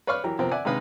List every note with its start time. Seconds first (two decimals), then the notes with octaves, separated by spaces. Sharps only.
0.07 B4 C#5 D5 F5 C#6 F6
0.24 E3 F#3 G4 A#4
0.39 C3 F3 B3 C4 A#4
0.51 D5 E5 F#5 G#5
0.65 C3 G#3 D#4 B4 F5 D#6